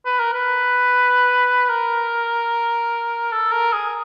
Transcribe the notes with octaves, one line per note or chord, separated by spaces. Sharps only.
B4
A#4
B4
A#4
A4
A#4
G#4